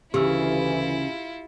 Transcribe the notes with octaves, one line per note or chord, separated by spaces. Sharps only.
D2 C#3 E3 E4 F4 G4 E6